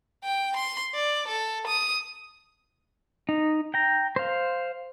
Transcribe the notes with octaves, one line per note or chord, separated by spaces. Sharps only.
G5
C6
D5
A4
D#6
D#4
G5 A#5
C5 F5